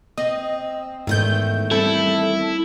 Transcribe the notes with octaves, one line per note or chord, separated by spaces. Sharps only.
C4 D#5
E2 G#2 D#3 A3 G6
G3 C4 E4 A4